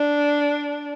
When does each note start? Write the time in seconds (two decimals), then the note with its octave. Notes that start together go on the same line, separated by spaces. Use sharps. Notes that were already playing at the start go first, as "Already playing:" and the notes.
Already playing: D4